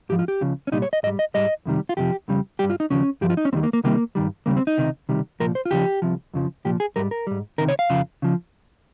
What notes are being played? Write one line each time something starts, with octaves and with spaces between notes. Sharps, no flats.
G#2 F3 G4
F4
G4
C#2 C#3 F3
C#4
C2 A#2 G3 D#4
C#5
D#5
G#2 G3 D#5
D#5
G#2 G3 D#5
F2 C3 D#3 G3
F4
F2 C3 F3 G4
F2 C#3 G3
G2 G3 G4
F4
D#4
D#2 C#3 F3 C#4
G2 F3 G4
F4
D#4
C#4
D#2 D#3 G3 C4
A#3
A#3
C#2 C3 D#3 G3 A#3
G2 D#3 G3
D#2 C#3 G3 A#3
C4
D#4
C#2 C3 D#3
C#2 C3 D#3 G3
C2 A#2 F3 A#4
C5
F4
D#2 C#3 F3 G4
C2 C3 F3
F2 C#3 F3
C2 A#2 F3 G4
G#4
G#2 G3 A#4
A#4
G#2 G3
C#2 C3 D#3 A#4
C#5
F5
F2 C#3 F3
C#3 F3